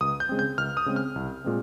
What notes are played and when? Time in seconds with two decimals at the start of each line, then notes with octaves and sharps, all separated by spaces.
0.01 C#2 D#6
0.20 G6
0.29 C#3 G#3 C4
0.39 G6
0.58 C#2 F6
0.77 D#6
0.86 C#3 G#3 C4
0.96 F6
1.16 C2
1.44 A#2 G#3 C4